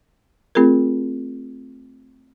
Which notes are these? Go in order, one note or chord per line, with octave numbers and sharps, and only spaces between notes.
A3 C4 F4 G#4 A#4